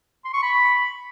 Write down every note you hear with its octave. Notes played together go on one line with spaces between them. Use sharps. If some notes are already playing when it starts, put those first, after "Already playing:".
C6
C#6
B5